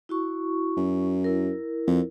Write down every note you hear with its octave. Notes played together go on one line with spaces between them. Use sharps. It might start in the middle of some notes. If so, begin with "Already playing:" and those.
E4 F#4 C#6
F#2
E4 A#4
F2